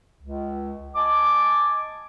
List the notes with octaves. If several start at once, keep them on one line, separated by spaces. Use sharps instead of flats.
C#2
D#5 G#5 A5 D6